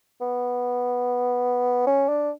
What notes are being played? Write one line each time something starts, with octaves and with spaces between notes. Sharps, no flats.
B3
C#4
D4